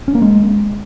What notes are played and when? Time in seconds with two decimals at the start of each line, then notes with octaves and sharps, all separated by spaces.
0.08 C#4
0.15 A#3
0.22 G#3